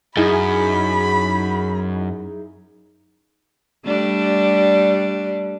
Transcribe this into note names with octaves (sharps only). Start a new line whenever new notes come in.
F#2 D#4 E4 G#4 B5
G3 A3 D4